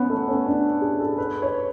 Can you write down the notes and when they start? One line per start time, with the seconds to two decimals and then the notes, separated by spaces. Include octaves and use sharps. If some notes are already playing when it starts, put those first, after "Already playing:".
Already playing: B3 C#4
0.10 A3
0.28 C#4
0.46 D4
0.82 G#4
1.00 A4
1.18 B4
1.42 C#5